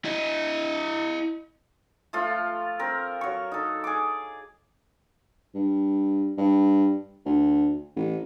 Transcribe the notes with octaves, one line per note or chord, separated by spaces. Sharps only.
E4 D#5
F3 A3 F4
C4 A#4
F#3 C#6
D#4 A4
G#4 D6
G2
G2
D2
A1